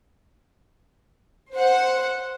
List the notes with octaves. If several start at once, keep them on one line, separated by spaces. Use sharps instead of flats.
C5 F#5